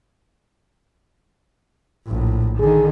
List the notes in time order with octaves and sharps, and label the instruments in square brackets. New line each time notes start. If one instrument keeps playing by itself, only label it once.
[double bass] A#1 A2
[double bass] D3 D#3 [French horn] G#4